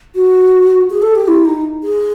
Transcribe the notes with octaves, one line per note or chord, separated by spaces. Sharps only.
F#4
G#4
A4
G4
E4
D#4
G#4